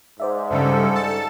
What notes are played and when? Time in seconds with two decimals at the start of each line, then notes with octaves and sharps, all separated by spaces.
0.20 G#2 C5 D5 E5
0.50 G2 C#3 G3 A4
0.96 A5